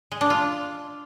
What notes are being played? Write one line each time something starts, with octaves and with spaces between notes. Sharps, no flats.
G#3
D4
F4